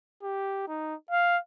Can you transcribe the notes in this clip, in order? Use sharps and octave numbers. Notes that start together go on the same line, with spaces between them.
G4
D#4
F5